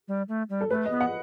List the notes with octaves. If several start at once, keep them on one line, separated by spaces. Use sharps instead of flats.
G3
A3
G3
A4
A3 B4
B3 D#5
F#5